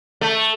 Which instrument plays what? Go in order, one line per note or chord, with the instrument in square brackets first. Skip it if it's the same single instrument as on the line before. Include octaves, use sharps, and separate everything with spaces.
[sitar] A3